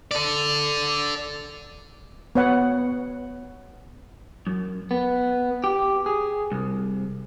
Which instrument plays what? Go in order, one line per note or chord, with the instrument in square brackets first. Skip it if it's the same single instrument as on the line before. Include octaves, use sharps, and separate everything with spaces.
[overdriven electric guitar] A4 D5
[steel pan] B3 C#5 F#5
[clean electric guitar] F#2
B3
G4
G#4
C2